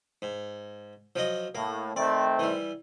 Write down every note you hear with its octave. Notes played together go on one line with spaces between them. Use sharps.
G#2
F3 F#3 D#5
A2 A#3
D#3 A3 C4 D5
E3 G3